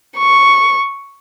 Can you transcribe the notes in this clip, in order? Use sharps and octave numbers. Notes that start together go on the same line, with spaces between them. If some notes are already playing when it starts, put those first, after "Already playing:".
C#6